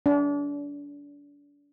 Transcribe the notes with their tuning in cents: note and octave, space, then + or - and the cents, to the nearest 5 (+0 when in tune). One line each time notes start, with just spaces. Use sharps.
D4 -35